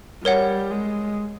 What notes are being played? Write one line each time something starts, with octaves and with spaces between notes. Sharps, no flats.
G3 A#4 C#5 F#5
G#3